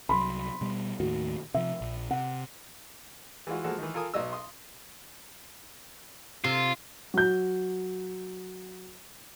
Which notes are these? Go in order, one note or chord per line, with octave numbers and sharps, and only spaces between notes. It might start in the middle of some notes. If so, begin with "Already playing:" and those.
C2 F#3 B5 C6
B2 G3
D#2 A2 D#3 F#4
C3 F3 E5
A#1
C3 F#5
E3 G#3 F4 F#4
F3 G#3 A#3 F#4 A4
D#3 E3
F4 A4 A#4 G#5 D#6
B1 F#3 D#5 E6
C6 D#6
C3 F4
F#3 G6